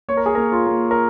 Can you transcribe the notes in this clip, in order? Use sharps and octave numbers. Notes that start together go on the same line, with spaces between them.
A#3 C#5
A#4
G#4
A#3 A#4
F4
A#3
A#4